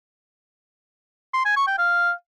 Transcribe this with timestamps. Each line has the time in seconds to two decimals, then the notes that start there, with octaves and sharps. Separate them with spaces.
1.34 C6
1.45 G#5
1.56 C#6
1.67 G5
1.78 F5